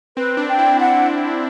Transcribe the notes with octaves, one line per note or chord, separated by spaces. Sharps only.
C4 B4
D4
G5
E4
D4 F#5